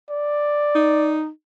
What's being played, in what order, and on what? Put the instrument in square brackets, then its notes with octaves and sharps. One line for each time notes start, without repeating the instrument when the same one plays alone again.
[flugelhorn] D5
[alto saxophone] D#4